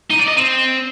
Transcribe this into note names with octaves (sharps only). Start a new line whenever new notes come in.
D#4
D5
D#5
C4